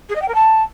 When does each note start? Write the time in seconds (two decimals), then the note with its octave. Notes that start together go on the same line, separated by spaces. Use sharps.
0.09 G#4
0.15 D#5
0.22 G5
0.28 A#4
0.35 A5